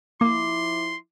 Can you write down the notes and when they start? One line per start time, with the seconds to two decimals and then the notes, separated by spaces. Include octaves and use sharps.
0.21 F3 A#3 E4 C6 D6